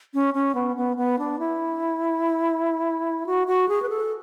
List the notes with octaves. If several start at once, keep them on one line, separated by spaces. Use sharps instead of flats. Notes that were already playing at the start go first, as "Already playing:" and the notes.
C#4
C#4
B3
B3
B3
D4
E4
F#4
F#4
G#4
B4
A4